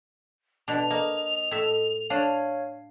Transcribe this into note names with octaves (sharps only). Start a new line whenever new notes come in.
B2 D4 F7
A#3 D#5
A2 E5
D4 C#5 F5